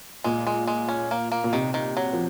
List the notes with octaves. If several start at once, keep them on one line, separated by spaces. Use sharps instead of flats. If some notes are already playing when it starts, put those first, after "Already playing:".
A#2 G#3
G#3
G#3
C#4
A#3
A#3
A#2
C3 D#3
D#3
F#3
F3